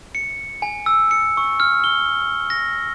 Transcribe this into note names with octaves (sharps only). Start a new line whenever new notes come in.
C#7
G#5
E6
C#7
C#6
F6
G7
A#6